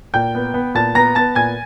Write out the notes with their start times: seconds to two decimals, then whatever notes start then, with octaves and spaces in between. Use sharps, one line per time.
0.14 A#2 G5 G6
0.35 B3
0.54 B3
0.75 A#2 A5 A6
0.95 B3 A#5 A#6
1.15 B3 A5 A6
1.35 A#2 G#5 G#6